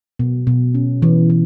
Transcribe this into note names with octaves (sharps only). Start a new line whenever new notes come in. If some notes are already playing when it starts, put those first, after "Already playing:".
B2
B2
C#4
E3
E3